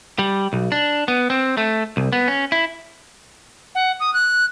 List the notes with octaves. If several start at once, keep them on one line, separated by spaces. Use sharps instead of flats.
G3
B1
D4
B3
C4
A3
C2
B3
C#4
E4
F#5
D#6
F#6